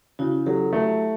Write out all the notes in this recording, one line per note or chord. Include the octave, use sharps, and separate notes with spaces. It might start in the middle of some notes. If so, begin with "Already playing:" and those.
C#3 E4 F#4
F#3 G4 A4
A3